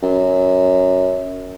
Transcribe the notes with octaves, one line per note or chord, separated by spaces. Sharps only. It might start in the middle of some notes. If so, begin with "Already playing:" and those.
F#2